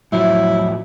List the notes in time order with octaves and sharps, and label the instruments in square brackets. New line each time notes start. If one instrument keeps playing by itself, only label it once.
[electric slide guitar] A2 F3 [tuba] F#3 [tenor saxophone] E4